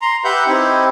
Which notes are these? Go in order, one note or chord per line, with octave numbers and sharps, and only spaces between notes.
A#5 C6
G4 B4 E5 F#5 B5 G6
C4 D#4 E4 G4